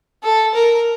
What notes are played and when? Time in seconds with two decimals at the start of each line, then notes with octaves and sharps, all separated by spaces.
0.23 A4
0.55 A#4